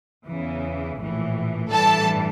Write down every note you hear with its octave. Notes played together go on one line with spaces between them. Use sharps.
E2 C#3 E3
A#1 A2 E3
A1 G2 E3 G3 A4 A5